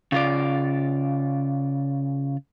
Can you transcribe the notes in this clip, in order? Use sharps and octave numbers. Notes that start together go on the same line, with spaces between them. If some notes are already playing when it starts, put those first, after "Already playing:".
C#3 F4 D5